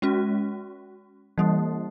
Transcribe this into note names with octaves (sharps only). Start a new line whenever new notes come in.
G#3 C#4 F#4
E3 G3 A#3